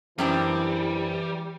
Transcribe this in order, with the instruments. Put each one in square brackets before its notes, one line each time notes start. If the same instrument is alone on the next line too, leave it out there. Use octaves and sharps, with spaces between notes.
[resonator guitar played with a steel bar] F#2 C4 D4 [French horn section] E3 [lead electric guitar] G3 [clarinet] E4